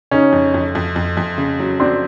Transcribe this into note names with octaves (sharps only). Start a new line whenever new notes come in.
C#3 C#4 D#4
F2
F2
F2
F2
F2
C#3
F#3
F#3 C4 D4